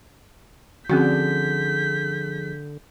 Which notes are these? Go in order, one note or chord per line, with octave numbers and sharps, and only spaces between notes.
D3 F3 C4 C#4 F#4 G#4 G6 B6